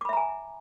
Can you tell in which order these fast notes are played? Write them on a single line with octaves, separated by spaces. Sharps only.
D6 B5 E5 A#5 G#5